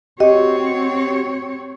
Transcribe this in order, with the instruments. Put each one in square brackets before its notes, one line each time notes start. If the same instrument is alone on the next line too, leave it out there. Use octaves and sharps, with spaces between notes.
[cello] C4 C#5 [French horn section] F#4 [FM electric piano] G4 [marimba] D#5